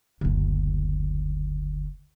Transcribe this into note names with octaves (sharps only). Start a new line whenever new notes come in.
F#1 D2